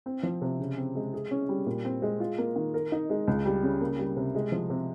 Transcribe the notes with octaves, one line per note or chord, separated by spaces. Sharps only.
C4
F3
C3
C#3
C4
G#3
G#4
C#4
G3
A#2
C4
G#3
F4
A#3
D#3
A#4
D#4
G#3
C#2
G3
C#3
A#3
G3
C3
G#3
F3
C3